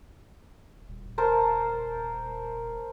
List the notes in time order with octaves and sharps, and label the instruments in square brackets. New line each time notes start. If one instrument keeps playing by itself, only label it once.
[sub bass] D#1
[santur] A#4 C5 A5